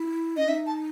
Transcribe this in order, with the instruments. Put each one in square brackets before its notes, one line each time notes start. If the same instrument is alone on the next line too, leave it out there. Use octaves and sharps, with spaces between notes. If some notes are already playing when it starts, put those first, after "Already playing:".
Already playing: [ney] E4
[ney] C#4 [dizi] D#5
[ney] D#4 [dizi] E5
[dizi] A5